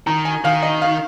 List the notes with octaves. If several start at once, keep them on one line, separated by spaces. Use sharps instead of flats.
D#3 A#5
G#5
D#3 F5
D#5
F5